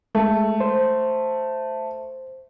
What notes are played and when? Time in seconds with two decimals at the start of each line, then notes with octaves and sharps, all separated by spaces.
0.15 G#3 A3
0.60 C5